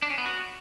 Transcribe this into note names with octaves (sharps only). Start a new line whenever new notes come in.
D4
C#4
B3
F#4